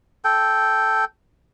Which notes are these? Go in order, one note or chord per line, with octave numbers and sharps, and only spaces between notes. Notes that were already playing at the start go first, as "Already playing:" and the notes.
A4 G5